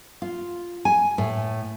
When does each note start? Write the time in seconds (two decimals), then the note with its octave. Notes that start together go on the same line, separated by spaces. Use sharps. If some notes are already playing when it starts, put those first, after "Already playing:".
0.22 F4
0.85 G#5
1.18 A2